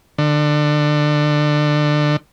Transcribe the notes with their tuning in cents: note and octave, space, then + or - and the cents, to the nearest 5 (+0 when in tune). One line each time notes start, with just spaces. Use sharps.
D3 +25